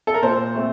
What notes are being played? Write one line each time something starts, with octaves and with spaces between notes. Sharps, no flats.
A4
A#4
A#2 C5
A3 C4